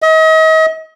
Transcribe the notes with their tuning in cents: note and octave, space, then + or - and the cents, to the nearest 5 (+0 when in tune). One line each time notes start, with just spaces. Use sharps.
D#5 +40